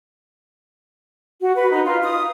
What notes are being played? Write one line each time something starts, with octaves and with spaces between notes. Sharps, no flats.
F#4
B4
D#4
F4
D#6